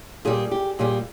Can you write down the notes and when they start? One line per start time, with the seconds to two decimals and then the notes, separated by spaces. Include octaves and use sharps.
0.25 A#2 G3 G#4
0.51 G4
0.79 A#2 G3 G#4